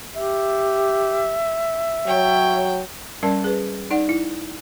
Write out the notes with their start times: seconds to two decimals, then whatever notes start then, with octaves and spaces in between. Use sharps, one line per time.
0.16 G4 E5
2.07 F#3 C#5 G5
3.23 G3 C#4 A#4 D5 A5
3.44 G#4 B4
3.91 D#4 D5 F#5
4.09 E4